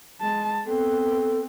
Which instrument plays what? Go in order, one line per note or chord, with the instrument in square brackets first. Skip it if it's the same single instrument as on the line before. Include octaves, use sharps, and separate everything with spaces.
[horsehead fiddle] G#3 A5
[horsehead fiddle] B3 C4 [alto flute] A4